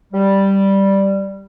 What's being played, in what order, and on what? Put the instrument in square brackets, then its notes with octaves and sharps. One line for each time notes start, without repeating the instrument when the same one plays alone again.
[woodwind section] G3